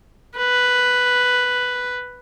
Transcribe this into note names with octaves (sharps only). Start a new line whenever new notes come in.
B4